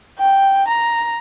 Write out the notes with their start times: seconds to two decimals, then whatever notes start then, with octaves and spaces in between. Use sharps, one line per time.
0.19 G5
0.68 A#5